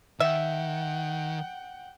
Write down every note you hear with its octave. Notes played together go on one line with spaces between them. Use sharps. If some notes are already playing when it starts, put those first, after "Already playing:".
D#3 E5 F#5 G5